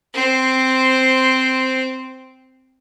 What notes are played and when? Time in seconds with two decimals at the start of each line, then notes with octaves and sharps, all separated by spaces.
0.14 C4 C5